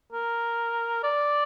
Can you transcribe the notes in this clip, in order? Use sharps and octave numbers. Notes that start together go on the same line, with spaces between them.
A#4
D5